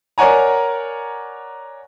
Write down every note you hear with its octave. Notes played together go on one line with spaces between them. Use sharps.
A#4 C#5 D5 F#5 G#5 A#5